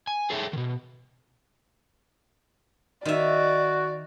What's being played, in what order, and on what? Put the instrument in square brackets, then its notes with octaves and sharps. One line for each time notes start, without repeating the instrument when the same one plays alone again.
[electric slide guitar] G#5
G#4 A4 C#5 E5 G5
B2 D#3
[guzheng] D#3 E5 [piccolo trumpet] F#4 [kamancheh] D5